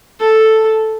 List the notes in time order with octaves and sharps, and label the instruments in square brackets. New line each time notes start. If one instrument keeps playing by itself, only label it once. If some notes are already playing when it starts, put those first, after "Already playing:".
[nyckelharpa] A4